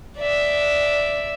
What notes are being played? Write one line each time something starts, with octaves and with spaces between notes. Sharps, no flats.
D5 E5